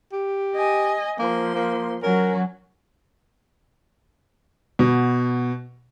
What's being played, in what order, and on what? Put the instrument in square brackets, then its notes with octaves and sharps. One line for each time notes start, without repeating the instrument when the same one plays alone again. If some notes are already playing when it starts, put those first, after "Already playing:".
[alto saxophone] G4
[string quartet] D#5 G#5
[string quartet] F3 C6 [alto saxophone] A#3
[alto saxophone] A#3
[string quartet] F#3 C#4 F#4 [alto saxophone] A#4
[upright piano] B2